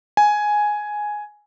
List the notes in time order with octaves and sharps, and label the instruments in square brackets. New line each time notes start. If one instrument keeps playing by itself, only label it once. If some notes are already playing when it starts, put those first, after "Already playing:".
[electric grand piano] G#5